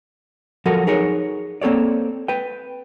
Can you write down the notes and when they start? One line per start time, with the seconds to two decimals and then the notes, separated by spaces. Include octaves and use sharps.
0.65 F3 F#3 F#4 A4 A#4
0.87 D#4 G#4 A#4 C#5
1.62 A#3 C4 A4 C#5 D5
2.28 B4 G5